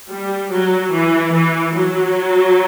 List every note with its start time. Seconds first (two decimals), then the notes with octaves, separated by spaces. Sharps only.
0.10 G3
0.52 F#3
0.93 E3
1.34 E3
1.75 F#3